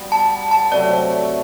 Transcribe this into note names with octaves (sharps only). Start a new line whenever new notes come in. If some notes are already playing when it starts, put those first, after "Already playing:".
Already playing: G3 B3 F#4
A5
A5
C3 F#3 A3 D5